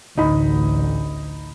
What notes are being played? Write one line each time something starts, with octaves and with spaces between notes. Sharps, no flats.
A1 D2 D#4 B5